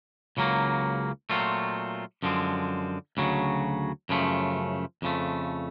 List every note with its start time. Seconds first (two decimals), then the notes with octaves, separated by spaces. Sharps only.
0.37 C#2 C#3 F#3 A#3
1.30 A#2 F#3 A3 C4 F4
2.23 F#2 D3 F3 G#3 C4
3.17 D2 C#3 F#3
4.09 F#2 C#3 F3 A3
5.02 F2 C#3 F3 A3